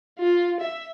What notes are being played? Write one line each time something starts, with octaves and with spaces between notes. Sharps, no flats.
F4
E5